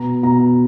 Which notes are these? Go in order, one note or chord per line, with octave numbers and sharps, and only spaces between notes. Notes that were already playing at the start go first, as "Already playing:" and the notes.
Already playing: B2 A#5
B2 A#5